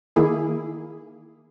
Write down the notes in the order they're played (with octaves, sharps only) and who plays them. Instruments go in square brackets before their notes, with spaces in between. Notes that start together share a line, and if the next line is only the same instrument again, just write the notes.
[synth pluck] D#3 A#3 E4 G#4